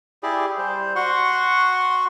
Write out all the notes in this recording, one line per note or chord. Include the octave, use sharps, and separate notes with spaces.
E4 G4 G#4 D5
G3 C5
F#4 F#5 C6 C#6